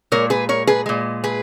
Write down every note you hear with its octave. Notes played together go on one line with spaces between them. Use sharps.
A#2 G#3 A#4 C#5
G#4 B4
A#4 C#5
G#4 B4
A#2 G#3
G#4 B4